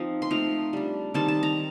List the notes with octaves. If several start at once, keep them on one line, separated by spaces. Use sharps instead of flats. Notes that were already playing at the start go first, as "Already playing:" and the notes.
Already playing: F3 C4 D#4
C6
F3 A3 C4 D#4 A#5
G3 D4
D#3 G3 C4 D#4 A5
A5
A#5